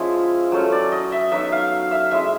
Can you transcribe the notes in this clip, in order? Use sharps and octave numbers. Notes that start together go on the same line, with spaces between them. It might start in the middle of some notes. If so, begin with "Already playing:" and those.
Already playing: F3 G#3 C#4 E4
F#3 A3 C#4
D5
D#5
E5
F#3 B3 D#4 E5
F5
E5
G#3 C#4 E4 E5